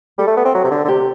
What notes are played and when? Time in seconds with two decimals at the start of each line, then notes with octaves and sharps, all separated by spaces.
0.19 G3 A4
0.27 A3
0.37 B3
0.45 C4
0.55 F#3
0.64 C3
0.71 D3
0.85 D3
0.88 C3 G4